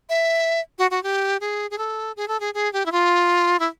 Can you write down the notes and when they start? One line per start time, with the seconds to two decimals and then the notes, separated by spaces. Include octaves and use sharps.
0.09 E5
0.78 F#4
0.91 F#4
1.03 G4
1.40 G#4
1.70 G#4
1.78 A4
2.16 G#4
2.28 A4
2.40 G#4
2.54 G#4
2.73 G4
2.86 E4
2.92 F4
3.59 E4